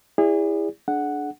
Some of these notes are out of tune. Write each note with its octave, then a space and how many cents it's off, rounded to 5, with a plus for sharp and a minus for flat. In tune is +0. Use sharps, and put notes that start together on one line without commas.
E4 +0 G#4 -35 D5 -20
D4 +0 G#4 +40 F#5 +0